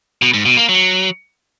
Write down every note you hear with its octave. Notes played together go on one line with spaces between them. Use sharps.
B2
G#2
B2
A#3
F#3